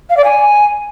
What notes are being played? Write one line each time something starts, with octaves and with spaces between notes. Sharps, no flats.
F5
D5
G#5